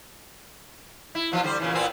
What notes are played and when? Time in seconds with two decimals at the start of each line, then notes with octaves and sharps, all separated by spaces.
1.15 E4
1.32 B2 F3 F4
1.43 D3 G3 C5
1.60 A#2 C#3 E3
1.72 A#2 B3 C4